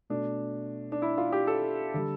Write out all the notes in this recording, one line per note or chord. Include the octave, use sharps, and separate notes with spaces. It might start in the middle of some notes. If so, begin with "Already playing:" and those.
B2 A3 D4
D4
E4
F4
G4
A4
D3 G3